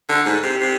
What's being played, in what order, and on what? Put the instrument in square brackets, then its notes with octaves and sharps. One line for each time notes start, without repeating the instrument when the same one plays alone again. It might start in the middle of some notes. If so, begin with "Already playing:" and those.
[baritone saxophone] D3
G#2
C3
C3